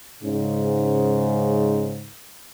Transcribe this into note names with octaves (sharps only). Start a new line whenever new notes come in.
G#2 C#3